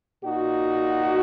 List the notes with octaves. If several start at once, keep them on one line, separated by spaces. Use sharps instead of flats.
A#2 D#4 F#4